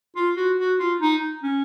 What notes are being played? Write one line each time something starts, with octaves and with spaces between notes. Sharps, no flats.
F4
F#4
F#4
F4
D#4
C#4